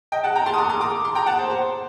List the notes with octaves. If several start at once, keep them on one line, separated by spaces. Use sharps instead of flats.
D#5 G5
F#5 A5
G5 A#5
A5 C6
D#6
A#5 D6
C6 D#6
A#5 D6
C6
G5 A#5
F#5 A5
C5
C5